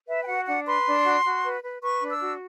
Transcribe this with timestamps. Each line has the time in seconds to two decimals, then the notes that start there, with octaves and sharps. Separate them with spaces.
0.07 B4 E5
0.22 G5
0.27 F#4 F#5
0.46 D4 F#5
0.66 B4 C6
0.86 D4
1.04 F#4
1.24 F#4
1.44 B4
1.63 B4
1.82 B4 C#6
2.01 D4
2.12 E6
2.21 F#4